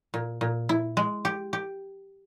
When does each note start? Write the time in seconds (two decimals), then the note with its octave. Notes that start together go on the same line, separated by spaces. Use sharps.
0.14 A#2
0.41 A#2
0.69 E4
0.97 G#3
1.25 G4
1.53 G4